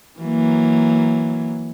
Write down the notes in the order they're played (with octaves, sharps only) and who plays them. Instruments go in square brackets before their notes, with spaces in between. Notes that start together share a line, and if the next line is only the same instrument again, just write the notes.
[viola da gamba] E3 F#3 A#3